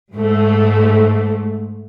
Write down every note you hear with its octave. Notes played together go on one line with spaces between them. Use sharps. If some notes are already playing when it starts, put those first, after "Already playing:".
G#2 A3